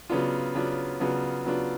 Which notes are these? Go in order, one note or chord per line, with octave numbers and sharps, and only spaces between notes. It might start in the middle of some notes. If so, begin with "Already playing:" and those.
C#3 F#3 B3 D4 F4
C#3 F#3 B3 D4 F4
C#3 F#3 B3 D4 F4
C#3 F#3 B3 D4 F4